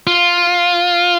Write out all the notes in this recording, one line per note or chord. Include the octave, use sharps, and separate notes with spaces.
F4